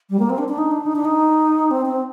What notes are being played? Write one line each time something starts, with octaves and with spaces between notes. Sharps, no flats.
G3
A#3
C4
D4
D4
D#4
D4
D#4
D4
D#4
C4
C4